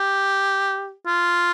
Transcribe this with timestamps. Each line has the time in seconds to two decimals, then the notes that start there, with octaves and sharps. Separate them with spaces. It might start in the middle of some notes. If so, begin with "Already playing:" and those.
Already playing: G4
1.07 F4